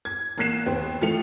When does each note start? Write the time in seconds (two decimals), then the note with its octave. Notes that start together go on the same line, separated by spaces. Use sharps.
0.05 G#6
0.38 A1 A#3 F#6 C7 E7
0.66 D#2 B3 C4
1.01 A1 F3 A3 C#7 F7